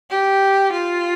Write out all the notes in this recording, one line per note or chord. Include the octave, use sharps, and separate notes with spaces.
G4
F4